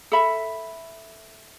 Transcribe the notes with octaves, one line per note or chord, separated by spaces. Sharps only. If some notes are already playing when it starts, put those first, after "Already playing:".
A4 E5 B5